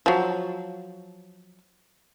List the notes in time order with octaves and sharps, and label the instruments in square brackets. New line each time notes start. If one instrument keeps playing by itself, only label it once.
[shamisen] F3 F#3